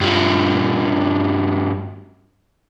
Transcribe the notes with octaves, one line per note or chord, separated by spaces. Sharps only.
G2 F3